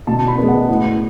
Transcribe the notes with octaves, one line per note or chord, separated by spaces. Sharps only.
B2 A5
B5
G#3 B3
F#5
A2